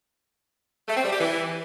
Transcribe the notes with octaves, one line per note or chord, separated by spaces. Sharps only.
A3
C4
G3
G4
E3